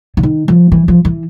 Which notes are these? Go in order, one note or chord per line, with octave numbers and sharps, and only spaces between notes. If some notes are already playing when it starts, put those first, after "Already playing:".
D3
D#3
F3
E3
F3
E3